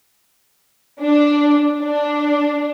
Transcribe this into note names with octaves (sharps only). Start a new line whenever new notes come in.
D4
D4